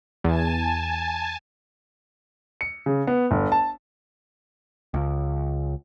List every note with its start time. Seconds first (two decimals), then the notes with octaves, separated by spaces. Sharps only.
0.24 E2 G#5 A5
2.61 C#7
2.86 C#3
3.07 B3
3.31 G1
3.52 A5
4.94 C#2